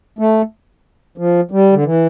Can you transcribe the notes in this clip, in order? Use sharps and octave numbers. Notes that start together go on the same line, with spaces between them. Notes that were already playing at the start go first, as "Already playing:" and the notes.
A3
F3
G3
D3
E3